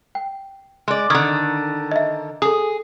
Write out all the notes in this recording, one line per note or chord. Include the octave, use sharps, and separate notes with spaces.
G5
G#3 D5
D3 D#3 D#6 F6 G#6
D#5 E5
G#4 A4 D#6